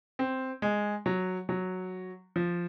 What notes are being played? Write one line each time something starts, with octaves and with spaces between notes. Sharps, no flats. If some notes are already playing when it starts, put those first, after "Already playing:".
C4
G#3
F#3
F#3
F3